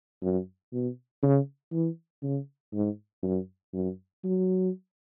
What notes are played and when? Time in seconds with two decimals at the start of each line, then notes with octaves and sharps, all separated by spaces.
0.22 F#2
0.73 B2
1.23 C#3
1.72 E3
2.23 C#3
2.73 G#2
3.23 F#2
3.74 F#2
4.24 F#3